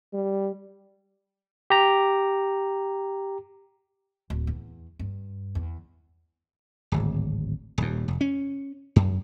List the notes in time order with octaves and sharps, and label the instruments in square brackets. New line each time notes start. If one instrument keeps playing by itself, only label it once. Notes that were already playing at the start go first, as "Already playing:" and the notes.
[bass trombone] G3
[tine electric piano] G4 A#5
[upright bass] D1
E2
G2
E2
[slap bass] D1 G#1
D#1 D#2
F1
C#4
F#2